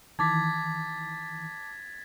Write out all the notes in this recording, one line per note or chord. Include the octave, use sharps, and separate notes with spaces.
D#3 E3 A5 D6 G#6 A6 B6